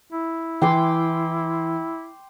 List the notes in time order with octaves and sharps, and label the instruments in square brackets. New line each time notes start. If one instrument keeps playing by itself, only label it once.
[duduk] E4
[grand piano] E3 [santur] G5 C6 D6